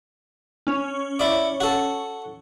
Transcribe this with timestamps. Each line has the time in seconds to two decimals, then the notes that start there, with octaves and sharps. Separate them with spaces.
0.67 C#4 C#5
1.19 E4 D5
1.60 F#4 A4